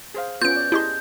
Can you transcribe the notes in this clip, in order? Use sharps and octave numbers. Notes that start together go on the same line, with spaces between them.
G#4 C5 F5
B3 C#4 F4 G6 D7
D5
E4 G4 G#4 D#5 A5 C6